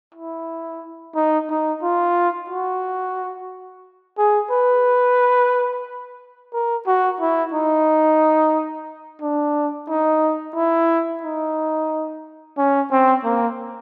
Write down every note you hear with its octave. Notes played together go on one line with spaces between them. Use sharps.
E4
D#4
D#4
F4
F#4
G#4
B4
A#4
F#4
E4
D#4
D4
D#4
E4
D#4
C#4
C4
A#3